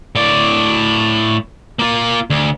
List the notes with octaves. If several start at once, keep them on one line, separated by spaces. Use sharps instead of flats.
A2 D5
A#3 F4
D2